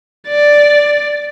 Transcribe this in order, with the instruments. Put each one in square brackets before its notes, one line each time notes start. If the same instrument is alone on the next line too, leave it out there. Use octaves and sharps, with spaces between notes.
[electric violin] D5